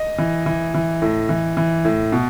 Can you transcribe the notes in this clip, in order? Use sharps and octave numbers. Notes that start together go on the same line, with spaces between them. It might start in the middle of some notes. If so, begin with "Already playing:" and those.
Already playing: D#5
E3
E3
E3
A2
E3
E3
A2
B2